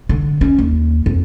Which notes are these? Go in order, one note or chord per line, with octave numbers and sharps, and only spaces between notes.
D3
C#4
D#2
F2